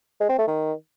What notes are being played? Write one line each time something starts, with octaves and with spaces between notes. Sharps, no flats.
G#3
C4
A3
D#3